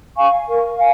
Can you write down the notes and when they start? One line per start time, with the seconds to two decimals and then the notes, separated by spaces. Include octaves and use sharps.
0.16 F5 G#5 C#6
0.47 A#4
0.77 F5 G#5